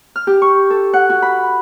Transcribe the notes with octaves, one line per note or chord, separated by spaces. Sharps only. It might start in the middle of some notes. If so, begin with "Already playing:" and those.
F6
G4
C#6
A4
F#5
F#4
B5